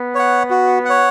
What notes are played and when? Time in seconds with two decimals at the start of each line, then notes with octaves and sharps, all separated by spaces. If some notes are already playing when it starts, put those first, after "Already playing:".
Already playing: B3
0.15 C#5 F#5
0.50 F#4
0.85 C#5 F#5